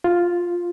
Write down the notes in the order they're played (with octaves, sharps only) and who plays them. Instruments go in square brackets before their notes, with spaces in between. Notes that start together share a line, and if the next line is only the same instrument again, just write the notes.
[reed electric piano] F4